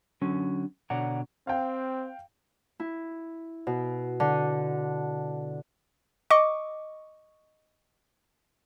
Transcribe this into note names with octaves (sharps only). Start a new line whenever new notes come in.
D3 F#3 C#4
B2 D3 C#5 D5 F#5 A#5
C4 F5 G5
E4
B2
D3
D#5 C#6 D6